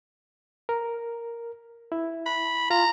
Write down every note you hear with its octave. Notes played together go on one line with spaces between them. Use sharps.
A#4
E4
B5
F4 A#5